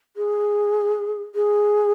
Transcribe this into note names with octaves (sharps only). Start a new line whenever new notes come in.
G#4
G#4